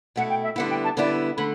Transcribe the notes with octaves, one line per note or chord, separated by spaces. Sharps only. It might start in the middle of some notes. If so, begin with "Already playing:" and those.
B2 A3 E4 F#5
G5
E5
D3 G3 B3 E4 F#5
G5
A5
D3 G3 B3 E4 D5
D3 A3 B5